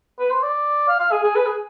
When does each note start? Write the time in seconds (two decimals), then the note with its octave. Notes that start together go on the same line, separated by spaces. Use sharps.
0.19 B4
0.31 C5
0.43 D5
0.88 F5
1.00 F5
1.12 G#4
1.23 G#4
1.36 B4
1.46 G#4